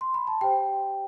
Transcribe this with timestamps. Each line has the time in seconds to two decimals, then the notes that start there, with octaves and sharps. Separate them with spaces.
0.01 C6
0.14 B5
0.27 A5
0.41 G4 C5 G5